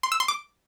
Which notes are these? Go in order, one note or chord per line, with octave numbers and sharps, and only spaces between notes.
C6
E6
C6
D6